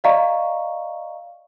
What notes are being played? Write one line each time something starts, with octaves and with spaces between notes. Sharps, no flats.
D5 D#5 F5 A#5 C#6